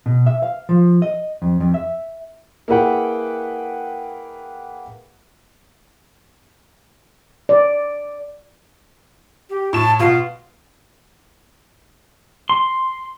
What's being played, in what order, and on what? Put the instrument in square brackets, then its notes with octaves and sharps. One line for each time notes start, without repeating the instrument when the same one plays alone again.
[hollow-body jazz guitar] B2
E5
F5
F3
D#5
F2
F2
E5
[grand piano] A#3 E4 G#4 B4 F#5 G5
[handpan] D5
[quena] G4
[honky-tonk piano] A2 E7 [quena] A5
[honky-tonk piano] B2 [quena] F4
[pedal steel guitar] C6